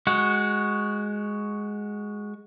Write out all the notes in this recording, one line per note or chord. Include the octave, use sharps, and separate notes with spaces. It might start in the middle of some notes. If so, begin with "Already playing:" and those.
G#3 F#4